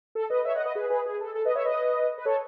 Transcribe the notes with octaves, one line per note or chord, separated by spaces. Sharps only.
A4
B4 D#5
C#5 E5
D#5 F#5
B4 D#5
G#4 B4
G#4 B4
G#4
A4
A4
B4 D#5
C#5 E5
B4 D#5
B4
A4 C#5